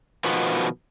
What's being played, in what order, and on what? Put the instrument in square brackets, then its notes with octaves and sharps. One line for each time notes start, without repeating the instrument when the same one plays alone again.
[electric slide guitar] B2 D#3 F3 B3